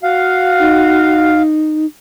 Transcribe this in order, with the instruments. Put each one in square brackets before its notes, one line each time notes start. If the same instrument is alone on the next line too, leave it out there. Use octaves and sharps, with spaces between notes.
[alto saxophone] F#4 [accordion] F5
[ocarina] D#4